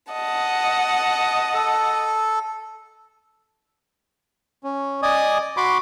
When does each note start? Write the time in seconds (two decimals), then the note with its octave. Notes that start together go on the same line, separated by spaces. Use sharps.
0.13 D#5 F#5 A5
1.54 A4
4.64 C#4
5.02 D5 D#5 G#5 D#6
5.57 F#4 B5 C6 D6